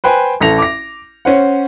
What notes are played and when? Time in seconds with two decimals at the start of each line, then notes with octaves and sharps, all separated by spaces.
0.04 B4 C5 G5 G#5
0.40 A1 A4 A#6 F7
0.58 D6 A#6
1.25 C#4 C5 F#5